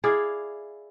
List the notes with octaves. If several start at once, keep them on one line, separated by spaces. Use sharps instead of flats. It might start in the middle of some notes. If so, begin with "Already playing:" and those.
E4 G#4 D5 F5